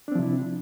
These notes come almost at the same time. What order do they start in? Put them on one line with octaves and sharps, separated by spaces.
D4 C4 F3 C3 E4